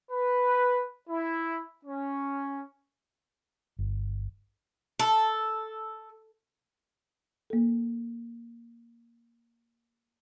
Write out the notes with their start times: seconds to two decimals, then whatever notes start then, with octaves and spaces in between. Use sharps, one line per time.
0.11 B4
1.10 E4
1.85 C#4
3.79 G1
4.99 A4
7.50 A#3 A4